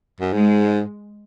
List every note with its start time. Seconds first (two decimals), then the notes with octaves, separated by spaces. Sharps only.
0.20 F#2
0.32 G#2 G#3